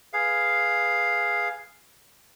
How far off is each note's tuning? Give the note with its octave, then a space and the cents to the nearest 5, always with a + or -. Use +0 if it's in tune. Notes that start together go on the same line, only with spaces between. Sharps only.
G#4 +0 B4 +0 F5 +0